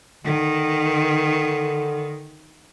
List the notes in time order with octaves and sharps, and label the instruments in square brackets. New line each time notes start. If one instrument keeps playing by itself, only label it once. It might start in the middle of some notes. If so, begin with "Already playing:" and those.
[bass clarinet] D3 [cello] D#3